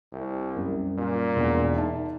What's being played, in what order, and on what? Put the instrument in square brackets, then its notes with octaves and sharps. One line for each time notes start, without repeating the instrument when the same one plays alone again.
[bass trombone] C2
[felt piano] F#2 G3
[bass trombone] A#2
[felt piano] E1
D#4 E5 A5